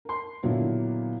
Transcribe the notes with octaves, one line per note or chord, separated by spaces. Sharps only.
A#4 C6
A#2 D3 F#3 B3 E4